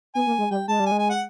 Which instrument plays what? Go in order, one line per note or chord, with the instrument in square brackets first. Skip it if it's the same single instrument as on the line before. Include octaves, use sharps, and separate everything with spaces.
[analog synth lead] B3 [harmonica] G#5
[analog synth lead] A#3
G#3
[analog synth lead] G3 [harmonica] G5
[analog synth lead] G#3 [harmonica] A5
[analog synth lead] G3
[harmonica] G#5
[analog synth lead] G#3
[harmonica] G#5
F#5